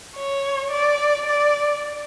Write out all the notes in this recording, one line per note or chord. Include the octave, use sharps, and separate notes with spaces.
C#5
D5
D5